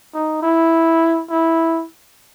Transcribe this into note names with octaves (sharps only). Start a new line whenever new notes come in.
D#4
E4
E4